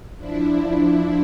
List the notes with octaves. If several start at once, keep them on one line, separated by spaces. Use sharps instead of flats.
F3 D4 E4